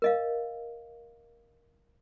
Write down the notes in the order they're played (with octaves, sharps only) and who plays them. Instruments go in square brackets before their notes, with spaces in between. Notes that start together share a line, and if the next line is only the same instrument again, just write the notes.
[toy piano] A#4 D#5 F5